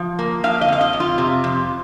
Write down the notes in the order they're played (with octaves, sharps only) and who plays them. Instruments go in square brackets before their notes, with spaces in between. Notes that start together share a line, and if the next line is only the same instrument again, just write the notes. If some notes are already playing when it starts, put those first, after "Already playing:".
Already playing: [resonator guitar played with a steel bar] F3
A#3
F3 F5
D#5
F2 F5
D#5
F2
F4
C3
F2